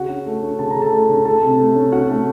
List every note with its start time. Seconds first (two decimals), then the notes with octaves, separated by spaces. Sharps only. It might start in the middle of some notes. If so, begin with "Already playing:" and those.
Already playing: C#3 F#4 F#5
0.09 C#4
0.26 A3
0.42 C#4
0.59 C#3 A5
0.71 C#3 A#5
0.82 A4 A5
0.92 A3
1.09 C#3
1.25 A3 A4 A5
1.43 C3
1.59 A3
1.75 C#4
1.92 C#4 F#4 F#5
2.09 A3